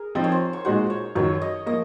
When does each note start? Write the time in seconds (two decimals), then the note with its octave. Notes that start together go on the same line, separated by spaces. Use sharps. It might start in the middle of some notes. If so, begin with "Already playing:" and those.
Already playing: G#4 A#4
0.15 F3 C4 D#4 C5
0.24 C#5
0.32 C5
0.53 C#5
0.65 A#2 G#3 D#4 F#4 C5
0.90 C#5
1.15 F#2 D#3 F#3 C#5
1.42 D#5
1.66 F3 A#3 D#5